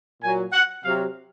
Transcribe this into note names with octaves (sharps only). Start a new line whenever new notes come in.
A#2 F#3 G#5
F#5
C3 F#3 F5